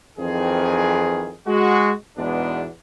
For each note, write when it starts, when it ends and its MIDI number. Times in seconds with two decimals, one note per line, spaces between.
0.18 1.32 41
0.18 1.32 51
0.18 1.32 52
0.18 1.32 60
0.18 1.32 68
1.47 1.90 56
1.47 1.90 66
2.17 2.66 40
2.17 2.66 44
2.17 2.66 47
2.17 2.66 56
2.17 2.66 59
2.17 2.66 62